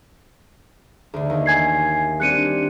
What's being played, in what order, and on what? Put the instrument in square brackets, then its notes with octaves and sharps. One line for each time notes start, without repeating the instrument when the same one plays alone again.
[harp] D2 D3
D#2
[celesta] G#5 G#6 C7
[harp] G3 C4 D4 [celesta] F#6 C#7 D#7